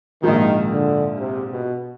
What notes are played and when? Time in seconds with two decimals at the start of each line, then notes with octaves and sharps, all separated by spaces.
0.23 A#1 G#2 D#3 F3
0.71 D3
1.18 C3
1.50 B2